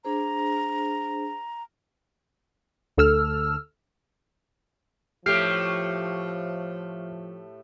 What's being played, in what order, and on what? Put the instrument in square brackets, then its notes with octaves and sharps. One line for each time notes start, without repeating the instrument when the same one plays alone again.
[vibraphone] D4 G#4 C5 [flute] A#5
[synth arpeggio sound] D2 A4 E6 F6
[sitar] A2 A3 G4 [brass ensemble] F3 [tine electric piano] F6 C7